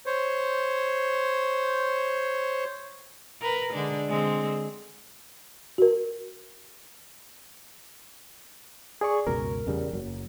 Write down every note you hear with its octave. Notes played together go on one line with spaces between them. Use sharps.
C5 C#5
A#4 B4
D3 G#3 D4
D3 G#3 C4
F#4 A#4
G#4 D5 C#6
C#2 F#2 B2 A#4
E2 C#3 G3
F#1 F#3